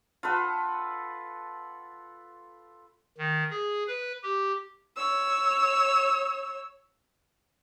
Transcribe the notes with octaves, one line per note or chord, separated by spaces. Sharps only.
F4 A4 B4 F#5
D#3
G#4
B4
G4
C#5 E6